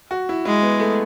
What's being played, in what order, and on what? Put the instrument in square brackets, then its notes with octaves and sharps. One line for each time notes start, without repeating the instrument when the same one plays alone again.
[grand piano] F#4
E4
[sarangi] G#3 [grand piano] E4
[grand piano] B3
A3